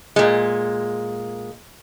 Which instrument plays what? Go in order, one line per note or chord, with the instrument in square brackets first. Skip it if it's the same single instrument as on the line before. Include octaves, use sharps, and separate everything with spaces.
[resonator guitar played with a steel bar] A#2 G#3